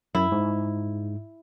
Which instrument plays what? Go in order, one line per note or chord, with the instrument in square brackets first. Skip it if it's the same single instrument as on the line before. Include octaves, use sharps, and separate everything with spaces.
[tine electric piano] F#2 [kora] E4
[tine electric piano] G#2